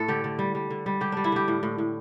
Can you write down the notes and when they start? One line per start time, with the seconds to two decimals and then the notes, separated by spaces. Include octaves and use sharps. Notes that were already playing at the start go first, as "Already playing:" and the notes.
Already playing: A2 A3 A4
0.08 D3 G4
0.24 D3
0.39 G3
0.55 G3
0.70 D3
0.86 G3
1.01 D3 G4
1.12 G3 D4
1.24 E4
1.32 D3 G4
1.48 A2
1.63 A2
1.78 A2